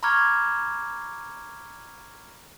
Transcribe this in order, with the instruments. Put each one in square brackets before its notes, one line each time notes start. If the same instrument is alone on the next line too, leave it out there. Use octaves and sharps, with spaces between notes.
[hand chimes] A#5 B5 C#6 D6 F6 G#6